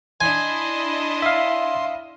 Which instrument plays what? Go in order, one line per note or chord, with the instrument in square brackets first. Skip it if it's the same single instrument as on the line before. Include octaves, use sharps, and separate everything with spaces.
[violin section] D4 E4 D#5 [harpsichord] G#5 [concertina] C6
[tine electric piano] E5 F5